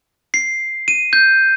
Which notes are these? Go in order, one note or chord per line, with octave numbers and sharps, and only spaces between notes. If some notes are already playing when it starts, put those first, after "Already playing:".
C7
D#7
G6